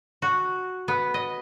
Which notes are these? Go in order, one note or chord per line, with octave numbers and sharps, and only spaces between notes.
F#4
B3
D#5